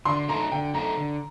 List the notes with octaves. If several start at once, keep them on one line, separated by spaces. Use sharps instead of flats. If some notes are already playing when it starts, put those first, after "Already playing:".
D3 C6
A3 D#4 A4 A#5
D3 G5
A3 D#4 A4 A#5
D3